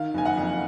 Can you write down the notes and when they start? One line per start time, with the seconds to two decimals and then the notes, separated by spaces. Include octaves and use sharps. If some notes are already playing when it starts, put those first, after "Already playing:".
Already playing: D#3 F5
0.14 F#1 G#5
0.25 F#5
0.37 F2